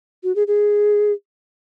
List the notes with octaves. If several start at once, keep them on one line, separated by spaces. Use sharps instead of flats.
F#4
G#4
G#4